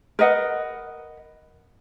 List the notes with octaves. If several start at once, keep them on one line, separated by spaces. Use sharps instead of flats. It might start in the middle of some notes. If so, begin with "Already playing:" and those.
A#4 B4 D#5 F#5